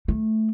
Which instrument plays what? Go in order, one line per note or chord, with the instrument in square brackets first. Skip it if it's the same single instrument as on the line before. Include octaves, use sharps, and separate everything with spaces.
[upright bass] A3